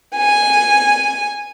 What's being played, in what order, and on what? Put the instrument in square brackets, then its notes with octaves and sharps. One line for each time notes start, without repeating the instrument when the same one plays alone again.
[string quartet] G#5